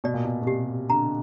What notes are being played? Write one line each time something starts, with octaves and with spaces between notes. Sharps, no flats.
B2 D5
A#2
B2
B2
C3 G4
D3 A#5